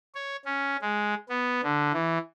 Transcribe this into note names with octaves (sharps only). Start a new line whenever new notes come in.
C#5
C#4
G#3
B3
D3
E3